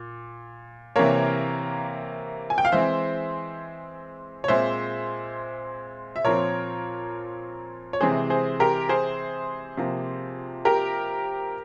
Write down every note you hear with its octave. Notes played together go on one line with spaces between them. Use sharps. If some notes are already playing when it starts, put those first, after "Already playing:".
Already playing: A#2
C3 E3 A#3 A#4 C#5
G#5
G5
F5
E3 G#3 C4 C5 E5
C#5
A#2 G#3 C4 C5 E5
E5
A#2 F3 C4 A#4 C#5
C#5
C3 E3 G#3 C4 G#4 C5
G#4 C5
G4 A#4
G#4 C5
C3 F3 A#3
G4 A#4